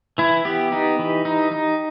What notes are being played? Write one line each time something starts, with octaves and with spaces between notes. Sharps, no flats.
E3 E4
B3 G4
D#4
E3
D#4
D#4